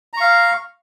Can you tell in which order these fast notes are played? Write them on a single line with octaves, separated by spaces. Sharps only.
A#5 C#6 F5